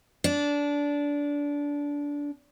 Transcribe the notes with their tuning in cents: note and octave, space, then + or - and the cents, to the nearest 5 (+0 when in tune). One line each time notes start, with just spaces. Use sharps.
D4 -20